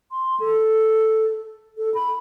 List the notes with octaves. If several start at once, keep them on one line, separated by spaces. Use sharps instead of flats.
C6
A4
A4
B5